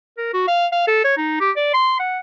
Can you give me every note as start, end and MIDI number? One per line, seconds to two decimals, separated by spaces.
0.18 0.32 70
0.33 0.44 66
0.48 0.67 77
0.72 0.82 77
0.87 1.00 69
1.04 1.16 73
1.17 1.39 63
1.40 1.51 67
1.56 1.71 74
1.74 1.97 84
1.99 2.20 78